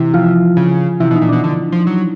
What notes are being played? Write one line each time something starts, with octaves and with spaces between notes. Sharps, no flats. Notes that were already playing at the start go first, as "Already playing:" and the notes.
Already playing: C3 E3 E4
F3 F4
C#3
C3 E3 E4
B2
D#4
A#2
B2 D4
D3
F3
F#3